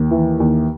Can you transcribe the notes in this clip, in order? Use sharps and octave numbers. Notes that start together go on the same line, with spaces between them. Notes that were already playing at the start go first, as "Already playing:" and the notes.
Already playing: D#2
E3
D#2